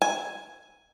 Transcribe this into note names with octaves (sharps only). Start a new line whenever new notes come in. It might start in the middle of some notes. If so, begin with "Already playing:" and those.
G#5